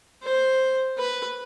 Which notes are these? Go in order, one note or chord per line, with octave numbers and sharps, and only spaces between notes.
C5
B4